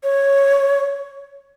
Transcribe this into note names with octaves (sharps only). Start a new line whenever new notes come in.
C#5